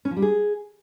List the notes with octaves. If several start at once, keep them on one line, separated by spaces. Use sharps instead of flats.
C#4
F3
G3
G#4